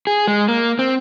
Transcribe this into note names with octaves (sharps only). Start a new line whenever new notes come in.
G#4
G#3
A#3
C4